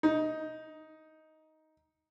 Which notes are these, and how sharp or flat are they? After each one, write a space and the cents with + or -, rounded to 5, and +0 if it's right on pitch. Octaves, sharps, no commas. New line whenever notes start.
D#4 +10